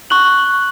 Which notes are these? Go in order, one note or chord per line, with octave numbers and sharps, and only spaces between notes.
C#6 F#6 F#7